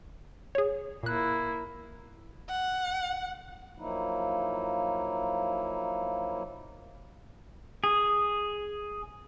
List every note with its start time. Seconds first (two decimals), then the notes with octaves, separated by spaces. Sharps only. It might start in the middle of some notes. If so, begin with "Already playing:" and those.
0.55 G#4 C#5
1.03 A#2 A#3 E4 F#6
2.49 F#5
3.78 F3 F#3 A#3 D#4 E4
7.84 G#4